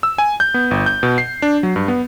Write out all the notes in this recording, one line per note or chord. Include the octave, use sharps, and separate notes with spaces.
E6
G#5
G6
B3
G1
G6
B2
C7
D4
F#3
G2
B3